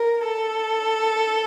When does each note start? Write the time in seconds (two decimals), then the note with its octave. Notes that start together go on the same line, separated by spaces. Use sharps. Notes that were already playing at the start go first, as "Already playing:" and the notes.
Already playing: A#4
0.24 A4